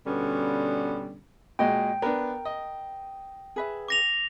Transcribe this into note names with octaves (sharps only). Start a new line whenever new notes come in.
B2 D3 G3 B3 C#4
A#2 G#3 F#4 D#5 G5
B3 D4 A#4
D#5
G#4 B4 E5
D6 A#6 F7